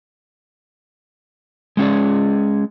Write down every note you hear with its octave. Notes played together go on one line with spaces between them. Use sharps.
G#3 C#4 G#4 D5